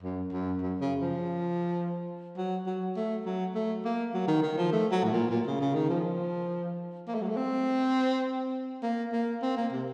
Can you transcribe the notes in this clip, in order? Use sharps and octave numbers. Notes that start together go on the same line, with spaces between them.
F#2
F#2
F#2
C#3
F3
F#3
F#3
A3
F#3
A3
A#3
F#3
D#3
D#3
F3
A3
F#3
A2
A#2
A#2
C#3
C#3
D#3
F3
A#3
A3
F#3
A3
C4
A#3
A#3
C4
A#3
C3